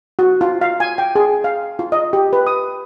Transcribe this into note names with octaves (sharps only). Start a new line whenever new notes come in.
F#4
F4
F5
G#5
G5
G#4
F5
F4
D#5
G4
B4
D#6